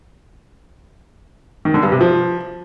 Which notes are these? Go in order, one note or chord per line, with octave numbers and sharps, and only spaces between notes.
D#3
D3
G2
C3
F3